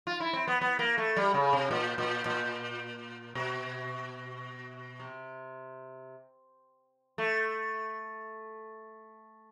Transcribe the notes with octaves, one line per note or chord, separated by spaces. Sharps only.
F4
E4
C4
B3
B3
A#3
A3
G3
C#3
C3
A#2
A#2
A#2
B2
C3
A3